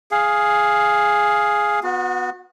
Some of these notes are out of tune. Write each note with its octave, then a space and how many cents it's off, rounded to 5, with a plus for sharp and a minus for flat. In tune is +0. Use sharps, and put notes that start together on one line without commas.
G#4 +0 F5 +0
B3 +0 F#4 -35